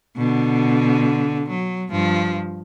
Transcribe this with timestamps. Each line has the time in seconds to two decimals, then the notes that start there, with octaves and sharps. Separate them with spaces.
0.16 B2 D3
1.50 F#3
1.90 G2 F3